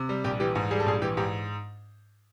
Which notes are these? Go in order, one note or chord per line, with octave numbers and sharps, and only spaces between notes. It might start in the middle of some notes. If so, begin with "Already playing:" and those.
Already playing: C3
G3
A#1 G4
E3 G4
G#2
G3 G#4
A4
A#1 G#4
E3 G4
G#2 G4